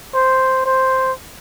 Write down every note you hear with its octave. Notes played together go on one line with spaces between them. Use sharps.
C5
C5